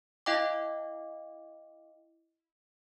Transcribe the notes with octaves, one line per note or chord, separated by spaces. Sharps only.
E4 D#5 F5 G5 D6